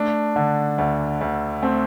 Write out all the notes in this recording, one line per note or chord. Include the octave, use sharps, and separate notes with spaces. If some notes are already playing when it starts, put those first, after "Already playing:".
Already playing: A3 D4
D3
D2
D2
A3 C4